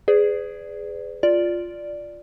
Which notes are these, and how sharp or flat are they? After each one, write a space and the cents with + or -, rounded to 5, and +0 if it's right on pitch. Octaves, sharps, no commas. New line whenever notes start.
G#4 +0 B4 +40 D5 +0
F4 +0 D5 +0